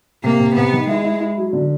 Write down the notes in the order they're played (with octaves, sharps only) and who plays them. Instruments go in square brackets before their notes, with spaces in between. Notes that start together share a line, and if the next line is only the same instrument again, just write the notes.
[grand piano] C3 [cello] A#3
[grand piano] C3
[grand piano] C3 [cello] B3
[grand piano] D#3
[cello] G#3 [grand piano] E4
[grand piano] E4
E4
F#3
D3